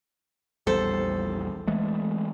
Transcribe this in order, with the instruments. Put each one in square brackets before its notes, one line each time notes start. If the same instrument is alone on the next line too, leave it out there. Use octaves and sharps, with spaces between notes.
[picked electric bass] A#1 E2 G3 [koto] A4 C5
[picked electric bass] E3 G#3 A3